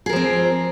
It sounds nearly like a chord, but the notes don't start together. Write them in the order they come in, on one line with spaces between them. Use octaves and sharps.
G#4 A#4 F3 C4